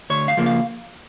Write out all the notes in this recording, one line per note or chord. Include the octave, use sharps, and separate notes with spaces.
D2 C#5
F5
C#3 F3 A#3
F5